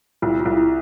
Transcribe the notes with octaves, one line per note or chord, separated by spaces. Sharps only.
C2 F4
F4
C2
E4